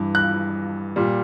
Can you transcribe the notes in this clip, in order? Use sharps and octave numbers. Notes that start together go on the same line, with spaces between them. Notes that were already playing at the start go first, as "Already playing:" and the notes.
Already playing: G2 E3
F#6
A#2 G3